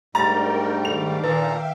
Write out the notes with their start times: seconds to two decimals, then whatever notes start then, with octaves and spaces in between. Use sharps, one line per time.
0.15 G#2 G3 A3 D4 A#4 G5 A#5 A6
0.85 D#3 A4 F5 D6 F7
1.24 A#2 D#3 A4 B4 E5 F5 G5 A#5